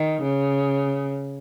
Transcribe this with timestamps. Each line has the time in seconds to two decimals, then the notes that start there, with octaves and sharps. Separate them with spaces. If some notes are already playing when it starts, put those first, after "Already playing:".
Already playing: D#3
0.22 C#3